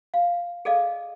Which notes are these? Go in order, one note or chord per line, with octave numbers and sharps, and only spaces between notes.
F5
G#4 A4 D5 D#5 F5